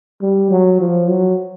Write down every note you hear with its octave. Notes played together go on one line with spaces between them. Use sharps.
G3
F#3
F3
F#3